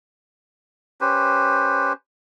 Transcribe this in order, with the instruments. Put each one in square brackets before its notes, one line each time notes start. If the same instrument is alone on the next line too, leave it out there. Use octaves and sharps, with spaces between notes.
[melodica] C#4 G4 B4 C5